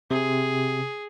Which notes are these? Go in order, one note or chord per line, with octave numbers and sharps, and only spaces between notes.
C3 G#4